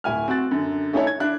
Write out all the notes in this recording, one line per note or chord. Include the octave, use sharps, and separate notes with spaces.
D1 E4 G#5 F6
C4 F#4 F#6 A6
F#2 D3
A3 C#4 D#4 E4 A4 C#5
G#6
D4 E4 F#6